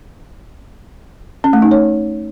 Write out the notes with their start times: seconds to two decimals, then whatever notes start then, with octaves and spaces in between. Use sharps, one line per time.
1.44 C#4
1.53 A3
1.62 D#4
1.71 C#5